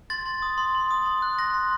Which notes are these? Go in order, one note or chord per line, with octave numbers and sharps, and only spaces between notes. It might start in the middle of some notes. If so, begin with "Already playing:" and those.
C6 A6
C6
D#6
C6
C6
D#6
C6
F#6
C6 A#6
C6